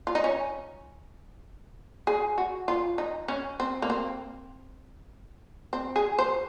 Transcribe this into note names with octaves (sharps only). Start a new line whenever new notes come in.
F4
D#4
C#4
G#4
F#4
F4
D#4
C#4
C4
A#3
C4
C4
G#4
C5